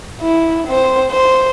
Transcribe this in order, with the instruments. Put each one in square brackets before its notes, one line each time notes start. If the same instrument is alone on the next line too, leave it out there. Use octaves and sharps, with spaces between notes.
[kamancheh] E4
C4 C5
C5